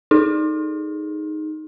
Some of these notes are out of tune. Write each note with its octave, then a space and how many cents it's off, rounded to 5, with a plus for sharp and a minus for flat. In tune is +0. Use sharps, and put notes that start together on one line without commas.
D#4 +0 G#4 +0